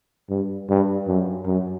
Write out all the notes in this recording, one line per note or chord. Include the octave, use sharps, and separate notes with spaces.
G2
G2
F#2
F#2